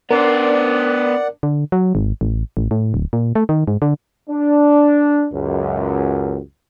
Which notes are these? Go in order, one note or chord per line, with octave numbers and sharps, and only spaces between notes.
B3 D4 A#4 C5 D5 F#5
D3
F#3
G#1
A1
A1
A2
D1
A#2
A3
D#3
G#2
D3
D4
C#2 F#2